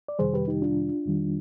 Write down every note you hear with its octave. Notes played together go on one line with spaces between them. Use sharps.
D5
F2 C3 D#3 G3 G#4 C5
G4 B4
D#4 G4
D4 F4
F2 D#3 G3